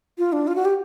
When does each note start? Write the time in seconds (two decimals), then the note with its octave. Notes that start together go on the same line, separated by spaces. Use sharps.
0.18 F4
0.33 D4
0.47 F4
0.55 F#4
0.65 G4